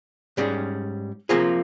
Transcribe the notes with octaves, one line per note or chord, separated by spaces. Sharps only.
G#2 G3 C#4 G#4
C3 F3 A#3 F4 G#4